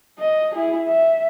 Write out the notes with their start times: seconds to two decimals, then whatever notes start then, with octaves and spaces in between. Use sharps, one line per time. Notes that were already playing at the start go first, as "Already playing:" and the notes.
0.19 D#5
0.55 E4 G#4
0.88 E5